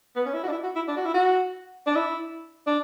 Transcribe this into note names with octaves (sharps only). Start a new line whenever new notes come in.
B3
C#4
E4
F#4
D4
E4
F#4
E4
D4
F#4
E4
F#4
D4
E4
D4